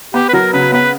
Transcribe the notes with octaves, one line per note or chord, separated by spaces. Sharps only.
B3 G4
B4
F#3 A#4
C#3 B4
B3 B4